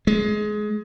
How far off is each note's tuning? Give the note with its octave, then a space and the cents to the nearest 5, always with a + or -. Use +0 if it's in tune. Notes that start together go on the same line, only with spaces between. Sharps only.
G#3 +20